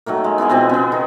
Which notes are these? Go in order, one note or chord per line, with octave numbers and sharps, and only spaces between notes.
D#3 F#3 A3 A#3
G#3
B3 E4 G#4 D5
B2 F3 B3 C4
C#3 B3
D#3